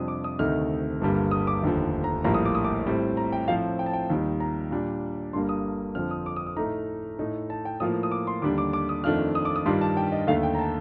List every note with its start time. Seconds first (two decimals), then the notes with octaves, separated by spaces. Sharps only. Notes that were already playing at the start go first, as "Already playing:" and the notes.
Already playing: F2 C3 G3 D4 F4 D#6
0.08 D6
0.24 D#6
0.39 D2 C3 D#3 A3 D#4 F6
1.01 G1 G2 D3 G3 A#3
1.31 D#6
1.47 D6
1.63 F1 D#2 D3 F3
2.04 A#5
2.24 A#1 A2 G3 A#3 A#5
2.34 D#6
2.45 D6
2.55 D#6
2.64 D6
2.87 A2 G3 C4
3.17 A#5
3.32 G5
3.48 A2 F3 C4 F4 F5
3.79 G5
3.86 A5
3.93 G5
4.10 D#2 D#3 G3
4.40 A#5
4.71 A#2 G3 D4
5.33 G1 G2 D3 G3 A#3 C6
5.49 D#6
5.95 F2 D3 F3 C4 F6
6.11 D#6
6.26 D6
6.36 D#6
6.46 D#6
6.56 A2 A3 D#4 A#5
7.19 A2 A3 D#4
7.50 A5
7.65 G5
7.80 A2 F3 A#3 F4 D#6
8.03 D#6
8.11 D6
8.27 C6
8.42 D#2 D3 G3 D4 D6
8.58 D6
8.73 D6
8.89 D#6
9.04 F2 D#3 A3 D4 F4 F6
9.35 D#6
9.45 D6
9.56 D#6
9.66 G2 D#3 G3 D4 F4 C6
9.81 A5
9.97 G5
10.12 D#5
10.27 D#2 D3 A3 F5
10.43 G5
10.55 A#5
10.59 A5